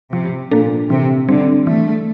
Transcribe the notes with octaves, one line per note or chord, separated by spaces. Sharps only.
C3 F3
A#2 A#3 D4 A4
C3 E3
D3 G3 C4
E3 A3